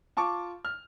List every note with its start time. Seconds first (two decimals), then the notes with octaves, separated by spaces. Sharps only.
0.17 F4 A5 C#6 D6
0.65 F6